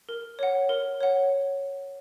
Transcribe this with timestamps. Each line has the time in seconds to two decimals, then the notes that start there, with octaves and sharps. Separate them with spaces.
0.09 A#4
0.39 C#5 F#5
0.69 A#4
1.01 C#5 F#5